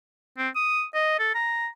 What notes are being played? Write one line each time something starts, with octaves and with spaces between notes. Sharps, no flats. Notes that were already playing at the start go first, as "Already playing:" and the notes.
C4
D#6
D#5
A4
A#5